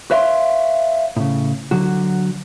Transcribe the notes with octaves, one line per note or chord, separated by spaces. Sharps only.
B4 C#5 E5 F5 B5 C6
A2 C#3
D3 F#3 F#4